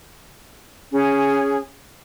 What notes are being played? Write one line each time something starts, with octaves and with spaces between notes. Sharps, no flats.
C#4 G#4 C#5